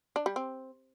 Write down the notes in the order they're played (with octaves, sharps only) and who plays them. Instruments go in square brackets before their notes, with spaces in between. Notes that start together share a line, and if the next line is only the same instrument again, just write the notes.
[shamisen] D4
G3
C4